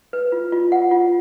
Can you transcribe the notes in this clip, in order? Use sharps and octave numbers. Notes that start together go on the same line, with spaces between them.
B4
F4
F4
F#5
F4